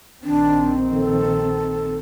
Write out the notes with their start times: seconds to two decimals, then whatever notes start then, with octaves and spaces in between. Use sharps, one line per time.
0.24 A#1 D#3 C4 D4
0.93 A4